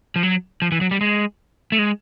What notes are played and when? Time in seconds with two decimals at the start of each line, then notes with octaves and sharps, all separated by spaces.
0.16 F3
0.23 F#3
0.62 F3
0.72 E3
0.81 F#3
0.91 G3
1.01 G#3
1.72 A3
1.79 G#3